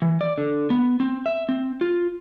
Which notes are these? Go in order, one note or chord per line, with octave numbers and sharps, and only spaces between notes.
E3
D5
D3
B3
C4
E5
C4
F4